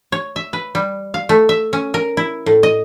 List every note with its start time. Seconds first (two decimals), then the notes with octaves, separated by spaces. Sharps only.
0.12 C#5
0.36 E5
0.53 B4
0.75 G3
1.14 F5
1.29 A3
1.49 E5
1.73 C#4
1.94 A#4
2.17 E4
2.46 A2
2.63 D#5